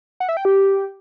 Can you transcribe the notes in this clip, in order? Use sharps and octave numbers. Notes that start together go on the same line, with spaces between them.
F#5
E5
G5
G4